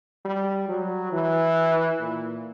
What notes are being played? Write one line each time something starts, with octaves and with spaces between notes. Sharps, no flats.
G3
F#3
E3
A#2